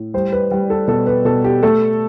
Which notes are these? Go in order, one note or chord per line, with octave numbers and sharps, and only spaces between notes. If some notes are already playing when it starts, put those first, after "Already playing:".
Already playing: A2
G3 C5
B4
G3
A4
B2 A4
B4
B2 A4
G4
A3 A4